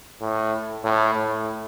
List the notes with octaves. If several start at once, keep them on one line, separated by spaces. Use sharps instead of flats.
A2
A2
A2